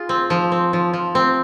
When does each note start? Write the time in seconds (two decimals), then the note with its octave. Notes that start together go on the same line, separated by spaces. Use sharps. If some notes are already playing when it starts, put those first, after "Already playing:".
Already playing: F4 G#4
0.09 C4
0.30 F3
0.52 C4
0.73 F3
0.93 F3
1.15 C4